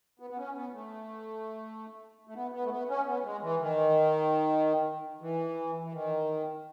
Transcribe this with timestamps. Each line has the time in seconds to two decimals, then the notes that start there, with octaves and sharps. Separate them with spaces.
0.20 B3
0.30 B3
0.37 C#4
0.56 B3
0.73 A3
2.27 A3
2.35 B3
2.52 B3
2.64 A3
2.71 B3
2.89 C#4
3.06 B3
3.24 G#3
3.43 E3
3.60 D#3
5.21 E3
5.83 E3
5.93 D#3